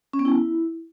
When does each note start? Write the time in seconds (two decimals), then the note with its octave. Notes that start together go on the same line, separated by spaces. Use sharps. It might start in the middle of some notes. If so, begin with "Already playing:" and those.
0.13 C#4
0.19 B3
0.25 E4